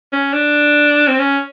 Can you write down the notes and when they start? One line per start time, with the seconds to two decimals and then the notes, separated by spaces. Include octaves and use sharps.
0.13 C#4
0.34 D4
1.08 C4
1.19 C#4